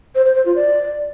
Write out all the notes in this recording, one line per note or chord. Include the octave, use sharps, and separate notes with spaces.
C5
C5
C5
F4
D5